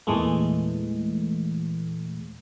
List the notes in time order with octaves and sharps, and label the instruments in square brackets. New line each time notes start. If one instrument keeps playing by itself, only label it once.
[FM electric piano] E2 A#2 E3 G#3 A3